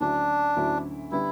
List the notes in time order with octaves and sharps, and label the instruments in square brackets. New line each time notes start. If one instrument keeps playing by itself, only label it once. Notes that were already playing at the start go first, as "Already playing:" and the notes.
[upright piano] D2 D3 F#3 C#4 E4 [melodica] D4
[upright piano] D2 D3 F#3 C#4 E4
[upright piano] D3 G3 B3 [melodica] E4